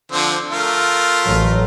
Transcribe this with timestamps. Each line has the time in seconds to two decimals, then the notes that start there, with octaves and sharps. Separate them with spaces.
0.12 D3 F3 C4
0.50 A3 F4 A#4
1.24 A1 F#3